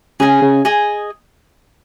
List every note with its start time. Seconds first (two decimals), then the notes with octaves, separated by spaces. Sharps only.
0.20 C#3 G#4 D#5 G#5
0.42 C#3
0.65 G#4 D#5 G#5